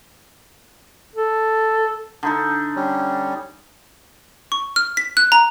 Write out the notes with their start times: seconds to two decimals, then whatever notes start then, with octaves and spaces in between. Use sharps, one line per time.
1.15 A4
2.23 D3 D#4 A4
2.76 G3 C#4
4.52 C#6
4.76 F6
4.97 B6
5.17 F#6
5.32 A#5